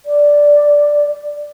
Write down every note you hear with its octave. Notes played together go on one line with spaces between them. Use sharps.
D5